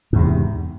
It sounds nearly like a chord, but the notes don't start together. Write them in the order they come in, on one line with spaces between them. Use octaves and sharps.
G#2 E2 C3